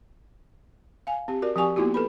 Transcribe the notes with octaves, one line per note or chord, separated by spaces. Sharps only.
F5 G#5
C4 G4
F#4 A#4 D5
F3 C4 G4 F#5 G#5 C#6
A#3 B3 D#4 E4 F#4 G4
A4 B4 B5